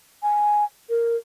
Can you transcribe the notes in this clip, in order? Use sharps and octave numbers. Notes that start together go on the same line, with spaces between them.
G#5
A#4